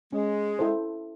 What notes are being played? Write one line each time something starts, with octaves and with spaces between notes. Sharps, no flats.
G#3 C#4
E4 A4 C5